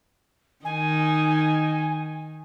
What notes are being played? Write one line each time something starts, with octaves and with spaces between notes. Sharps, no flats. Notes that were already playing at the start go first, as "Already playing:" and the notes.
D#3 D#4 G#5